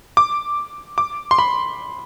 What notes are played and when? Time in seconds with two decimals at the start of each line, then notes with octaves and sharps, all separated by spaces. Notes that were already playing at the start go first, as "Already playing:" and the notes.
0.17 D6
0.98 D6
1.31 C6
1.39 B5